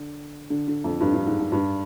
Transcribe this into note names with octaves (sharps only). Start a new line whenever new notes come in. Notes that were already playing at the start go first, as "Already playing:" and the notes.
Already playing: D3
D3
D3
F2
G2
G2
G#2
G#2
G2